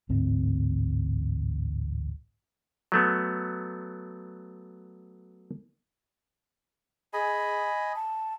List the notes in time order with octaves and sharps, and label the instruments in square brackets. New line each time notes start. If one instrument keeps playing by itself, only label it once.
[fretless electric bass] A1 D2 G#2 C4
[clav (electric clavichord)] F#3 A3 B3
[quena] G#4 [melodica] D#5 G#5 B5
[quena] A5